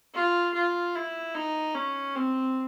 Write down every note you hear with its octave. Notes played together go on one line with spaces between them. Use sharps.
F4
F4
E4
D#4
C#4
C4